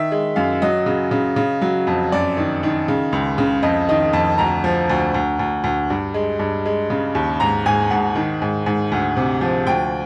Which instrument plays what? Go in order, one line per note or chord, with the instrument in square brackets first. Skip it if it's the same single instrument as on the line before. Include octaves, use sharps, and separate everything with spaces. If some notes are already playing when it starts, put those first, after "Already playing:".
Already playing: [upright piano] D#3 E5
G#3
F#2 F5
F#3 D#5
C#3
C#3
C#3
F#3
F2
F#2 D5
D#3
D#3
C#3
C#2
C#3
F2 D#5
D#3 D#5
F2 A5
D2 A#5
F3
D2
D2
D2
D2
G2
G#3
G2
G#3
C#3
D#2
G#2 A#5
G#2 G#5
G#2 F#5
D#3
G#2
G#2
D2
C3
F3
D2 G5